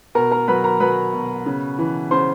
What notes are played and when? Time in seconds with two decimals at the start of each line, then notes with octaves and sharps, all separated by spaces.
0.15 B2 A#4 A#5
0.31 A#4 A#5
0.48 F#3 B4 B5
0.64 A#4 A#5
0.80 F#3 B4 B5
1.14 B2
1.46 C#3
1.79 E3
2.11 C#3 C5 C6